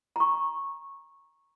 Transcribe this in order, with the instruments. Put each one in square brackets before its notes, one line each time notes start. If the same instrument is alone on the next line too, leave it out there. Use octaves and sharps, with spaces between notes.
[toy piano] A#5 C#6